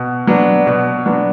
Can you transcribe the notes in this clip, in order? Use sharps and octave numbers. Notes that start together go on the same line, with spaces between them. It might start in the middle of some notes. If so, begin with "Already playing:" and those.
Already playing: B2
F#3 B3 D4
B2
F#3 B3 D4